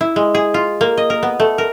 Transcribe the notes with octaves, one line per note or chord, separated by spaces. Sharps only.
E4
G#3
G#4
F4
A#3
D#5
A#4
B3
A3
A#4